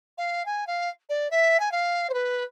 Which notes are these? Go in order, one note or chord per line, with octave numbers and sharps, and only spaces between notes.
F5
G#5
F5
D5
E5
G#5
F5
C5
B4